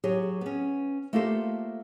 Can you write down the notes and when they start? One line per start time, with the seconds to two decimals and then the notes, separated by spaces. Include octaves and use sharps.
0.04 F#3 G4 G#4 C#5
0.41 B3 C#4
1.13 A3 A#3 F4 G4 A4 C5